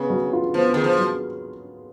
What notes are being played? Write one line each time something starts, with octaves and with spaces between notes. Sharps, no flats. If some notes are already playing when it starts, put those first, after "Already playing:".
Already playing: C#3 B3 G#4
F#3
F4
F3 B3
D#3 G#4
F3
F#3